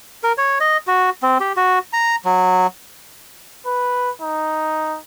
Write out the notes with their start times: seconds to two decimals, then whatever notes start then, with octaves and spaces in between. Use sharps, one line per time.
0.24 A#4
0.38 C#5
0.61 D#5
0.87 F#4
1.23 C4
1.40 G4
1.57 F#4
1.93 A#5
2.25 F#3
3.66 B4
4.21 D#4